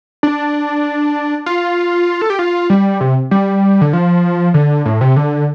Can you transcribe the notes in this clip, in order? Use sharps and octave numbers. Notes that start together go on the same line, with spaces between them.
D4
F4
A4
G4
F4
G3
C3
G3
D3
F3
D3
A2
C3
D3